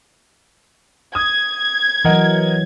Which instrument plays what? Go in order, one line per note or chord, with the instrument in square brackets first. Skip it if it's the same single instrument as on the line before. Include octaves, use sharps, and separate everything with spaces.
[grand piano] D#6 [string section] G#6
[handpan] E3 F#3 [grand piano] A#4 D#5 F#5